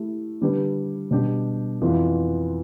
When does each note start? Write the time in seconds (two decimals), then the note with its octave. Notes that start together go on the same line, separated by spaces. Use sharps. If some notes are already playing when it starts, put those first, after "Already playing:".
Already playing: A3 E4 G4
0.41 D3 G3 D4 G4 B4
1.11 B2 G3 D4 G4
1.81 F2 E3 B3 F4